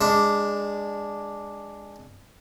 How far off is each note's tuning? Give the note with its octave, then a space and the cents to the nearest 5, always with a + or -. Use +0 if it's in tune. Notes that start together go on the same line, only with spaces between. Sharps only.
G#3 -15 D4 +0